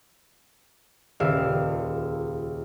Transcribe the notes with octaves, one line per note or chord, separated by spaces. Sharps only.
D#1 C#2 E5 F5